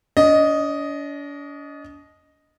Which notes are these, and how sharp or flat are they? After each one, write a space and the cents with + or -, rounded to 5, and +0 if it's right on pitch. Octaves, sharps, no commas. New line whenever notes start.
D4 -45 D#5 +0